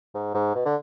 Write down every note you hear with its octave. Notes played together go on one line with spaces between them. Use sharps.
G#2
G#2
B2
D3